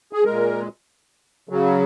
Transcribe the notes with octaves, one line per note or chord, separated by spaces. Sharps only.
G#4
A#2 G#3 A#4
C#3 F#3